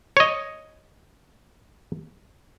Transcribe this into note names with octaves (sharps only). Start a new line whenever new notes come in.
C#5 D#5